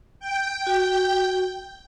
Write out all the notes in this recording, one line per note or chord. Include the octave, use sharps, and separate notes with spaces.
G5
F#4